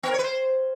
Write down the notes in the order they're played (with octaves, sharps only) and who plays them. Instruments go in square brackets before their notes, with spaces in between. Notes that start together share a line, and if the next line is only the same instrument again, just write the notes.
[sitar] B3
A#4
C#5
B4
C5